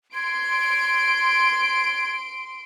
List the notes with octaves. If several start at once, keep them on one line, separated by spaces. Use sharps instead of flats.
C6 G#6 D7